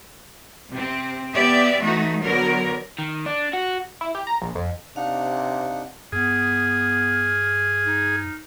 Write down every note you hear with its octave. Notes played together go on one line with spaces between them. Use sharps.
C3 C4
B3 G4 D5 E5
E3 A3 D#4 F#4
D3 F#3 B3 A#4
D#3
D4
F#4
E4
G4
A#5
A#1
F2
C3 D4 D#4 F5 F#5
G2 B3 G#4 F6
D#4